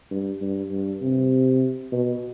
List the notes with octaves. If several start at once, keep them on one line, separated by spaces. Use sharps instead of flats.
G2
G2
G2
C3
B2